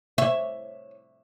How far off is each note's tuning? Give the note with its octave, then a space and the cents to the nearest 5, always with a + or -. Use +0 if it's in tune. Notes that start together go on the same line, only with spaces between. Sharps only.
C#5 +0 E5 +0